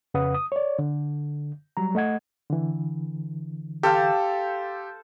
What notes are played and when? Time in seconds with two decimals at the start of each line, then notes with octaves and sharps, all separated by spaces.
0.14 F2 C#3 B4 F#5 D#6
0.34 D#6
0.52 C#5 D5
0.79 D3
1.77 F#3 G3 A#5
1.95 A3 D#5 F#5 G#6
2.50 D3 E3
3.83 G4 A4 C5 F5